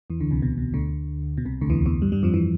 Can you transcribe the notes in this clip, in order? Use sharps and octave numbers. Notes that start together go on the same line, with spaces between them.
E2 E3
D2 D3
C2 C3
B2
B2
D2 D3
B2
C2 C3
D2 D3
E2 E3
E2 E3
G2 G3
G2 G3
F2 F3
E3